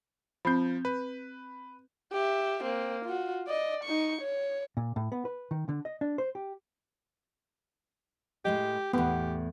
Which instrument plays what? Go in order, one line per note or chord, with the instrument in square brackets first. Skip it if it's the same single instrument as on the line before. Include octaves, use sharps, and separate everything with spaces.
[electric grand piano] F3 G6 [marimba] C4 B5
[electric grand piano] B4
[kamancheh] G4 E5
A#3 C4
F4 F#4
D5 D#5
D#4 C#6
C#5
[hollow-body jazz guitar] A#2
A2
B3
B4
D#3
D3
D#5
D4
C5
G4
[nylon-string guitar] A2 G#3 D#5 [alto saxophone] G4
[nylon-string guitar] E2 A2 [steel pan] B3 [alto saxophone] G4